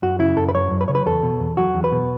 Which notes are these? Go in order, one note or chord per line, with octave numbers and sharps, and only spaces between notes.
F#2 F#4
C#3 E4
F#2 A4
B4
F#3 C#5
F#2
B4
C#3 C#5
B4
E2 A4
B2
E2
F#3 F#4
E2
B4
B2